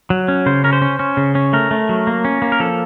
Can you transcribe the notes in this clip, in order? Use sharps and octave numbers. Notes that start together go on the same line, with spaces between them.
F#3
C#4
C#3 C5
C#4 A#4
C5
C#4
C#4
C#3
C#4
A3 A#4
A3
F#3
A#3
C#4
A#3
A#4
F3 A4